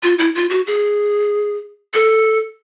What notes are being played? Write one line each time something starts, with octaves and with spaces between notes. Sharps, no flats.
F4
E4
F4
F#4
G#4
A4